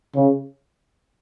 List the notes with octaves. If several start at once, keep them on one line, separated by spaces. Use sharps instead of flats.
C#3